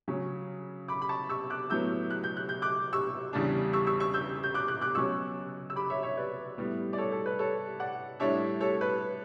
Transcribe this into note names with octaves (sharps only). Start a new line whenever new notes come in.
C#3 F#3 C#4
B5 D6
B5
A5 C#6
C#6 E6
D6 F#6
A2 F#3 B3 E6 G6
F#6
G6
F#6
G6
D6 F#6
C#6 E6
E2 C#3 G3 D4
C#6 E6
C#6 E6
C#6 E6
E6 G6
G6
D6 F#6
D6 F#6
D6 F#6
B2 F#3 C#4 C#6 E6
E6
B5 D6
C#5 E5
C#5 E5
B4 D5
A2 G3 B3
D5
A4 C#5
A4
B4
A4 C#5
D5 F#5
A2 G3 D4 C#5 E5
A4 C#5
B4